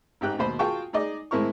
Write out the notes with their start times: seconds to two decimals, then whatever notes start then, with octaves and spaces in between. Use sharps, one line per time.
0.21 G#1 G#2 G4 G5 F#6
0.39 D#2 B2 C5 B5 C6
0.59 F4 F#4 G#4 G5 A5 C#6
0.93 D#4 G#4 D5 D#5
1.31 A2 G#3 C4 E4 A#4 C#6